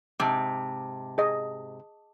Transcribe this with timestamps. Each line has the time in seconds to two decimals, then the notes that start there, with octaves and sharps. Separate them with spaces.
0.20 G#2 C3 A5 D6
1.18 G#4 D#5